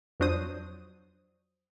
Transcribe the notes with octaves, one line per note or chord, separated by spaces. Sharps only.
F2 F3 F#3 D4 C5 D#6